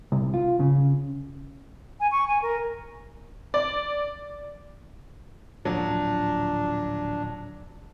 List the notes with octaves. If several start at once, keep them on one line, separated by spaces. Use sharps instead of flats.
C2
F4
C#3
G#5
C#6
G#5
A#4
D5
D1 A#2 F3 F#3 D4